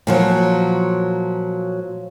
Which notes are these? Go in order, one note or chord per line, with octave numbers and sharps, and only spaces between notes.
A#2 F3 F#3